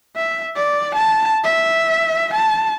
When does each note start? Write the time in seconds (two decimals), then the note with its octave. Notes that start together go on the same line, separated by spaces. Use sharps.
0.16 E5
0.56 D5
0.95 A5
1.44 E5
2.34 A5